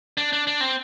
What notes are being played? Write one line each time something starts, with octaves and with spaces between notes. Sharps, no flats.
D4
D4
D4
C4